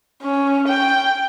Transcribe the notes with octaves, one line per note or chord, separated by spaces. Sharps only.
C#4
G5